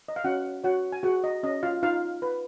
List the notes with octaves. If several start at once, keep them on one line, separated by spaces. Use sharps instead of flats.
D#5
F5
C#4 F#4 F#5
F#4 C#5 F#5
G#5
F#4 G#4 F#5
D#5
C#4 D#5
F4 F5
D#4 F4 F5
B4